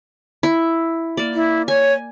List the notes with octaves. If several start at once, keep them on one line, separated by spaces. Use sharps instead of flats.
E4
A#3 D5
E4
C#5 G#5